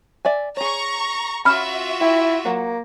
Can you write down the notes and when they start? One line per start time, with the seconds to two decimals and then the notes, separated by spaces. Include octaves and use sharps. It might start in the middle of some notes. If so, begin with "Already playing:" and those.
0.25 D5 E5 G#5
0.57 G#4 C#5 A#5 C#6
1.45 C#4 F4 F#4 E5 B5 F6
2.01 E4 G5
2.45 F#3 A#3 F#5